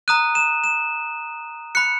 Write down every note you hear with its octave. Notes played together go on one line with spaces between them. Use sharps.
A#5 D#6 F#6 D#7
E7
E7
B5 F#6 C#7